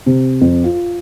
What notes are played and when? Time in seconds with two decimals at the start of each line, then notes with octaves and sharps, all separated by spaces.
0.06 C3
0.41 F2
0.64 F4